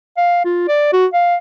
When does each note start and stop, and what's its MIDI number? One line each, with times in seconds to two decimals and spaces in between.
0.17 0.41 77
0.45 0.64 65
0.68 0.89 74
0.93 1.06 66
1.14 1.36 77